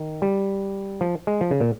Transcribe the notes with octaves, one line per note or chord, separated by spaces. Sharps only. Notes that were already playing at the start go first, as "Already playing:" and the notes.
Already playing: D#3
G3
F3
G#3
F3
C#3
A#2